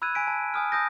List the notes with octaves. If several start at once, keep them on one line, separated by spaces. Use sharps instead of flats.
B5 E6 F#6 G#6 D#7
G#5 G#6 B6 D7
A5
G#5 D#6 F6
A5 D#6 G6 A#6